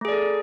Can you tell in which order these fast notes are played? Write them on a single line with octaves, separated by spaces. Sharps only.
A3 G#4 D5 A4